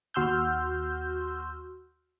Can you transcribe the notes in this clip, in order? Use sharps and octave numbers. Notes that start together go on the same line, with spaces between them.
D#2 F#4 C6 E6 F6 G6